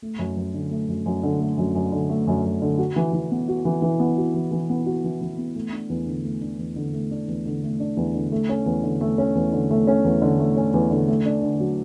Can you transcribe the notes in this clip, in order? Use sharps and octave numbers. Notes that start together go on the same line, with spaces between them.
A3
F#2
F#2
D3
A3
F#2
F#2
D3
A3
F#2
F#2
D3
A3
F#2
F#2
D3
F#4
E3
E3
B3
F#4
E3
E3
B3
F#4
E3
E3
B3
F#4
E3
E3
B3
A3
D4
E2
D3
A3
D4
E2
D3
A3
D4
E2
D3
A3
D4
E2
D3
A3
C#4
E2
D3
A3
C#4
E2
D3
A3
C#4
E2
D3
A3
C#4
E2
D3
A3
D4
D3
F#3